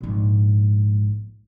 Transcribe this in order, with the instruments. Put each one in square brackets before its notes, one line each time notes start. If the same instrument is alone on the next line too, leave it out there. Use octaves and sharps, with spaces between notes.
[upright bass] A#1 G#2